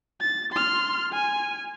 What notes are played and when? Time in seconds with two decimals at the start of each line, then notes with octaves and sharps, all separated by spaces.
0.21 A6
0.52 C6 F6
1.13 G#5